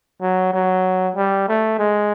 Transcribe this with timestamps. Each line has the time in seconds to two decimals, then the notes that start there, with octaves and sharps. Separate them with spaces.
0.21 F#3
0.53 F#3
1.16 G3
1.48 A3
1.79 G#3